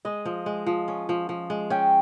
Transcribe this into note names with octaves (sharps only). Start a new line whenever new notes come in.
G#3 D#5
F3
G#3
F3
C#4
F3
F3
G#3
C#4 G5